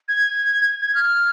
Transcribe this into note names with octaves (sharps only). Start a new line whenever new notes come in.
G#6
G#6
F6